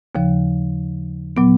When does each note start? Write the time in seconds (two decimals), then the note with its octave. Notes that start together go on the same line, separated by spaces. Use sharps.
0.15 D#2 C#3 F3
1.37 A#2 F#3 B3